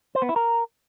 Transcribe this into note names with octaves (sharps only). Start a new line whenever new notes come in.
C5
B3
E4
A#4